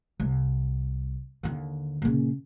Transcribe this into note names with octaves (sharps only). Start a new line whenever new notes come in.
C2
D#2 D3
A#2 C#3